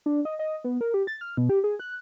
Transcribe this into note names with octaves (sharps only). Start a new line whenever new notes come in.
D4
D#5
D#5
B3
A#4
G4
A6
F6
B2
G4
G#4
F#6